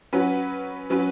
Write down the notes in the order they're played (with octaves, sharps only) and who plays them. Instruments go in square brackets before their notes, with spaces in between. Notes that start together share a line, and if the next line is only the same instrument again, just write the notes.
[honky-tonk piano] F#3 C#4 F#4 B4
F#3 C#4 F#4 B4